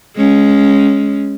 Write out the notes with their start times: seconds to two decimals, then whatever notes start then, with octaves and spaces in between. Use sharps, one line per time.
0.16 G#3 C#4